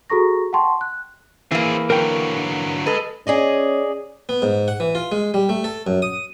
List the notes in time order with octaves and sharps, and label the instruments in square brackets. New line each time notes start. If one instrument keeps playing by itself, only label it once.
[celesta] F#4 G#4 A4 A#5 C#6 A#6
F#5 G5 A5 C6 C#6
F#6
[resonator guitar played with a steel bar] E3 A#3 [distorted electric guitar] C4 G#4
[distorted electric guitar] D3 F#3 [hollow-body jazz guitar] A#4 G5
[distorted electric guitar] G#4 D#5 [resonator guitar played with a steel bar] A4 B4
[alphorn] C#4 [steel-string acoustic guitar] G#4 D5 D#5
[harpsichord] B3
G#2
F#5
E3
F4
G#3
G3
A3
A4
F#2
D#6